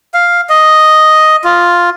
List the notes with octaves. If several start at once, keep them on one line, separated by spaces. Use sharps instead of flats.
F5
D#5
F4